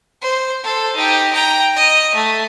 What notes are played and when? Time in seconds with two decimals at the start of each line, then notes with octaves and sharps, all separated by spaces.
0.22 C5
0.64 A4 C5
0.96 D#4 G4
1.33 G5 A#5
1.76 D#5
2.15 A3